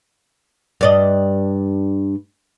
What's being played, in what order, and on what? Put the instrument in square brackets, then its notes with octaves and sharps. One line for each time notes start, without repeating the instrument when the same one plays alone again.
[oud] G2 D5 D#5